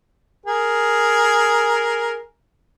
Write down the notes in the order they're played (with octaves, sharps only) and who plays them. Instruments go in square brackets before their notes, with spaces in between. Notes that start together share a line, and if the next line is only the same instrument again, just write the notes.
[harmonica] G#4 A#4